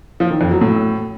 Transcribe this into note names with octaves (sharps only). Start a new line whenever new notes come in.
F3
D#3
F2
F#3
A2